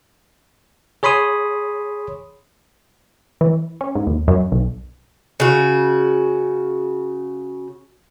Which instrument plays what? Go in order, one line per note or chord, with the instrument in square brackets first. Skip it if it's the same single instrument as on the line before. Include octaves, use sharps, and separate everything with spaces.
[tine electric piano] G#4 C#5 B5 C6 D#6
[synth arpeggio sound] E3
C#4
G#2
D#2
F#2
B1
[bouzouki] C#3 F#4